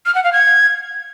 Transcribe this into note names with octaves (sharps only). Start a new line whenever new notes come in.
F6
F#5
F5
G#6